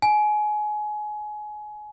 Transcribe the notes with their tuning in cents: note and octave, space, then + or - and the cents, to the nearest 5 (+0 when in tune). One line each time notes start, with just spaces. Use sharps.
G#5 +25